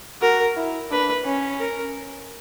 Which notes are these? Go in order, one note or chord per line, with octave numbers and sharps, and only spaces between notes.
F#4 A#4
E4
D4 B4
C#4
A#4